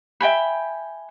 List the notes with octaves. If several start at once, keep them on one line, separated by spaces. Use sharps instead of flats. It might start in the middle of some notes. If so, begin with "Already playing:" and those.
E5 G5 G#5 B5